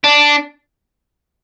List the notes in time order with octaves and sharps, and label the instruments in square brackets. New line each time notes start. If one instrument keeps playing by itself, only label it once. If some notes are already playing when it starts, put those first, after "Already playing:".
[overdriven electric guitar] D4